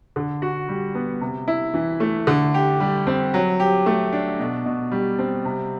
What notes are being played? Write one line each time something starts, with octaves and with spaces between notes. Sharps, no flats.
D3
F#4
G3
B3
C3
E4
E3
A3
D3
G4
G3
C4
F#3
G4
A3
D4
B2
B2
G3
C4
C3